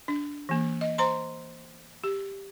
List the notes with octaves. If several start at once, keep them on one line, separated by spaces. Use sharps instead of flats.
D4
E3 A#3
D#5
C5 A#5 C6
G4